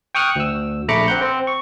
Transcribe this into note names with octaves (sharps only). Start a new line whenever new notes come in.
G5 C#6 D#6 F6 F#6
D2 E6
A#1 A3 A#5 B5 D6 C#7
C4 F#5 G6
C4
C#6